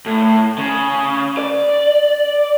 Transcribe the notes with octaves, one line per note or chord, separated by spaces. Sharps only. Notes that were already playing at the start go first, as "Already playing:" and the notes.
A2
C#3
D5